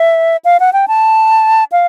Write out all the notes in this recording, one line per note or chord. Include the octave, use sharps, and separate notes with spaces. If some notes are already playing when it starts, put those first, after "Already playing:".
Already playing: E5
F5
F#5
G5
A5
F5